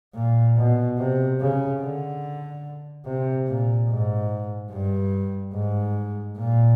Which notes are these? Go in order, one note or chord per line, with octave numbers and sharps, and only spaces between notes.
A#2
B2
C3
C#3
D3
C3
A#2
G#2
G2
G#2
A#2